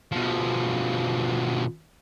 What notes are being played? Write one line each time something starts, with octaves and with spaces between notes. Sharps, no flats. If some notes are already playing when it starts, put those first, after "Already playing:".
B2 F3